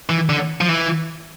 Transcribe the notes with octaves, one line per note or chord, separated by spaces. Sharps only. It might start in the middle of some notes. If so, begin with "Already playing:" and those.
E3
D3
F3
E3